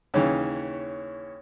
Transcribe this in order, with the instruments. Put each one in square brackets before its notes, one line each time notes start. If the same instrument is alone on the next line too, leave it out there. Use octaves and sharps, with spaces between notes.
[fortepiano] D#2 C#3 E3 [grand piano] C#5